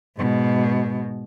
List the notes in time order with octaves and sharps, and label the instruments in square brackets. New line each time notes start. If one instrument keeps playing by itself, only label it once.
[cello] G#2 B2